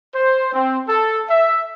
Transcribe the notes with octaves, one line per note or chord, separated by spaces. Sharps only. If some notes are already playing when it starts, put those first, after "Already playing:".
C5
C4
A4
E5